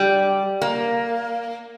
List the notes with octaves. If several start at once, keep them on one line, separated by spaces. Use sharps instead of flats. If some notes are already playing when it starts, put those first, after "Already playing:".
Already playing: G3
A#3